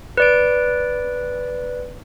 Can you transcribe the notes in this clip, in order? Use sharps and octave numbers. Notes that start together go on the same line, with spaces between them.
B4 D5 D7